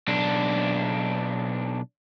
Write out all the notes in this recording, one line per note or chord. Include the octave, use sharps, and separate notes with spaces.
B1 D4